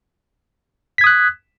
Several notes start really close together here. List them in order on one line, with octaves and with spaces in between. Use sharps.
B6 G#6 D#6 F#6